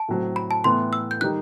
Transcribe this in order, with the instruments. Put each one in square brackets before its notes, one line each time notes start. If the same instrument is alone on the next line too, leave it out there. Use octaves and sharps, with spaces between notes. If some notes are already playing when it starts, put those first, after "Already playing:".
Already playing: [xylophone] A5
[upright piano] A2 F#3 C4
[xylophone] B5
A5
[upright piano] A2 E3 B3 [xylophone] C6
[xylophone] E6
G6
[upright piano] D#3 G3 D#4 [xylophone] F#6